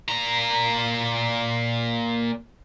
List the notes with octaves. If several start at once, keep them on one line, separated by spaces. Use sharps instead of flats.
A#2 A#5